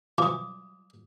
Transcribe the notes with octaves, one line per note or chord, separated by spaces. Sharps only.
B2 E3 F3 D6 D#6